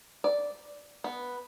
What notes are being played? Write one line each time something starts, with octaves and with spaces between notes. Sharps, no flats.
D5
B3